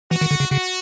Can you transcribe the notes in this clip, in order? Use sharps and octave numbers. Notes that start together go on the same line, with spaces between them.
E3 F#4
D#3
D3
C#3
C#3 F#4